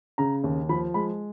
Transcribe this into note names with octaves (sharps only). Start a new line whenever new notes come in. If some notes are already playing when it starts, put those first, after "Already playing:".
C#3 A#5
D#2
F3 B5
G#3 B5